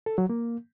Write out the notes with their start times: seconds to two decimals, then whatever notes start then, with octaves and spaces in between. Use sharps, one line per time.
0.06 A4
0.18 F#3
0.30 A#3